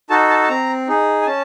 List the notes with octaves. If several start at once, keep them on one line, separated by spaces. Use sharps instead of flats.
D#4 F#4 A4 A5
A5
A5
C4 A#5
D#4 G#4
G#5
C#4 A5